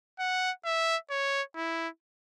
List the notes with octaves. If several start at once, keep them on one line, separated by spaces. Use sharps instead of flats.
F#5
E5
C#5
E4